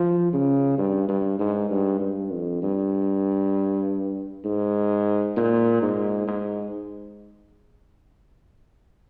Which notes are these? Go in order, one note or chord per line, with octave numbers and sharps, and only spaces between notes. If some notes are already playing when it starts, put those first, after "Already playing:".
Already playing: F3
C#3
G2
G2
G#2
G2
G2
F2
G2
G#2
A#2
G#2
G#2